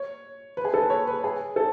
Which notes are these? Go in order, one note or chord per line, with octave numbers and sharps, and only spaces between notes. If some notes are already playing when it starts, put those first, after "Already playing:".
Already playing: C#5
B4
G#4
A4
B4
C#5
B4
G#4
A4